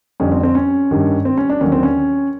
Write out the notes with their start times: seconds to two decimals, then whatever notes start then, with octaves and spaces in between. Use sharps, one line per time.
0.20 F2 D3 G3 C#4
0.32 C4
0.43 C4
0.55 C#4
0.91 G2 D#3 G3
1.25 C4
1.37 C#4
1.50 D4
1.61 D#2 D3 F#3 C#4
1.72 C4
1.83 C#4